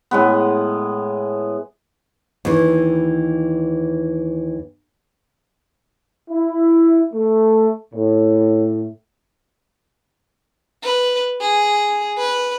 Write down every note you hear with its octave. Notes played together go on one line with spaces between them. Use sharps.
A2 G#3 B3
D#2 E3
E4
A3
A2
B4
G#4
B4